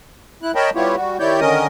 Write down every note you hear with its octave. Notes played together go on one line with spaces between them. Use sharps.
E4 F#6
A#4 C#5 D#5 G5 A5 B5
G3 B3 E4 F4 G4 C#5
G3 F#4
D#3 E4 G4 C#5 D5 G6
D3 D#3 C#4 A#4 D#5 D#6